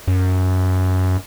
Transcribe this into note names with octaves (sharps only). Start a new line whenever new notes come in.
F#2